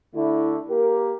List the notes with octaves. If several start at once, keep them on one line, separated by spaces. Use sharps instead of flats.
D3 A3 E4
A#3 G4 A#4